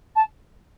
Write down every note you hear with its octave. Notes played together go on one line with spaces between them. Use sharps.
A5